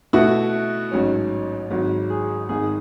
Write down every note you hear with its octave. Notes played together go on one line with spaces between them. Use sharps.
B2 A3 E4 F#4
A1 G#2 F#3 C#4
G#1 G#2 F#3
G#4
G#1 G#2 D#3 G#4